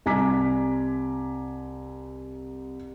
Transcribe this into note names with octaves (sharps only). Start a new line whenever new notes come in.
C2 G#5 A#5 D6 B6